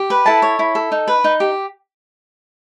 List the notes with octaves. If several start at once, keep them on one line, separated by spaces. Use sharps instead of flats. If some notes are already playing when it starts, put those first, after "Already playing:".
Already playing: G4
B4
E4 A4 A5
C#5
E4
A4
D#4
B4
D#4
G4